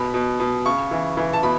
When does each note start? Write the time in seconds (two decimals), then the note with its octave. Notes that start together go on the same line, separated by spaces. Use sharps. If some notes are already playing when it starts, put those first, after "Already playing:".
Already playing: B2 B5
0.14 B2
0.40 B2
0.66 C#3 C#6
0.91 E3
1.17 E3
1.33 A5
1.43 B2 B5